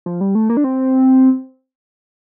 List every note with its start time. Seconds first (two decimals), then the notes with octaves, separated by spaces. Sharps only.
0.06 F3
0.21 G3
0.35 A3
0.49 A#3
0.57 D4
0.64 C4